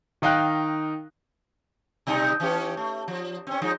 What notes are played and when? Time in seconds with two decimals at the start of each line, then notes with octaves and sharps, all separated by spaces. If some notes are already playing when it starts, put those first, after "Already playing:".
0.22 D#3 D#4 F5 G5 F#6
2.07 B2 G3 D#4
2.40 E3 C#4 G4
2.77 A3
3.08 F3
3.47 C4 C#4
3.62 F3 G#3 D#4